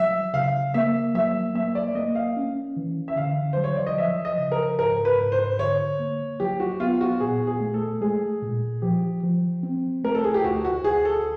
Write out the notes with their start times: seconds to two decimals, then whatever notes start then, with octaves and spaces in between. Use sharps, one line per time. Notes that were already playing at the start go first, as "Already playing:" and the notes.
Already playing: F#3 E5
0.33 C#3 F5
0.74 A#3 E5
1.15 F#3 E5
1.55 A#3 E5
1.75 D5
1.95 A#3 D#5
2.15 F5
2.37 C#4
2.77 E3
3.08 E5
3.16 D3 F5
3.53 F#3 C5
3.64 C#5
3.76 D5
3.87 D#5
3.97 F3 E5
4.25 D#5
4.38 C#3
4.52 A#4
4.79 G#2 A#4
5.05 B4
5.18 G#2
5.32 C5
5.59 D3 C#5
5.99 A#3
6.40 F#3 G4
6.60 F#4
6.80 B3 F4
7.01 F#4
7.20 A#2 G#4
7.47 G#4
7.61 A3
7.74 A4
8.01 G#3 G#4
8.42 A#2
8.82 F3 G4
9.23 F3
9.63 C4
10.04 A3 A#4
10.15 A4
10.24 G#4
10.34 G4
10.44 D2 F#4
10.65 F#4
10.84 D2 G#4
11.05 A4